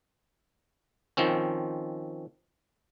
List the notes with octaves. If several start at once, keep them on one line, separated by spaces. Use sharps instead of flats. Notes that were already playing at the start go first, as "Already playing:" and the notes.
D#3 F3 C4 C#4